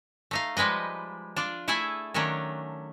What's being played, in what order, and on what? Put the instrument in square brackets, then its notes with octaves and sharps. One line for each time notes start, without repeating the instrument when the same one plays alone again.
[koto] A3 D#4 F5
F3 G3 G#3 B4 D#5
D4 F4 D5
A3 E4 G#4 A4 E5 G#5
D#3 F#3 A3 C#4 D4